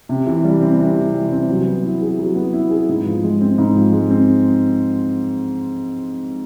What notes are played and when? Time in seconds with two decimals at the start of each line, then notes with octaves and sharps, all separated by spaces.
0.09 C3
0.26 E3
0.44 G3
0.62 C4
0.79 C3
0.96 E3
1.14 G3
1.32 C4
1.49 F#3
1.66 B3
1.84 E4
2.01 G#4
2.19 F#3
2.35 B3
2.53 E4
2.71 G#4
2.89 G#2
3.06 F3
3.23 G#3
3.41 C4
3.58 G#2
3.75 F3
3.93 G#3
4.10 C4